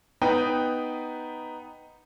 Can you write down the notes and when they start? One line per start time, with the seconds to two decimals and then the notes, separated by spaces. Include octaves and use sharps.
0.22 B3 D#4 B4 G5